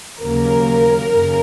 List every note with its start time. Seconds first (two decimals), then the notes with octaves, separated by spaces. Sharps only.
0.20 D#2 C#3 F#3 A#3 A#4
1.10 F#2 C#3